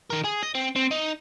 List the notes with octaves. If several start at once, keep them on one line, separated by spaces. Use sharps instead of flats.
D#3 A#4
G#4
D#5
C4
C4
D#4